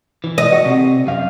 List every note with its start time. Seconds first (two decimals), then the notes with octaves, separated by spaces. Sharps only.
0.24 E3
0.38 D#5
0.52 F#4
0.66 C3
1.07 F#2 F5